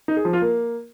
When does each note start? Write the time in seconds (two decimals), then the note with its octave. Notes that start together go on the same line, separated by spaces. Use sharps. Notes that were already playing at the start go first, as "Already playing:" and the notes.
0.08 D#4
0.17 G#4
0.25 F3
0.33 F4
0.42 A#3